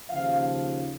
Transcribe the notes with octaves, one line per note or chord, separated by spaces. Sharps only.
D#2 C#3 F3 F5